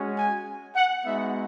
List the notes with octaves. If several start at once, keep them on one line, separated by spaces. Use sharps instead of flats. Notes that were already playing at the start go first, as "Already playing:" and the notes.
Already playing: G#3 C#4 F#4
G#5
F#5
G#3 B3 D#4 F#4 E5